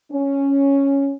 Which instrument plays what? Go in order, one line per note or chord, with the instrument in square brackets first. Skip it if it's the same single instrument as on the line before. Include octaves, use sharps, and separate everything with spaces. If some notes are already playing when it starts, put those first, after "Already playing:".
[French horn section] C#4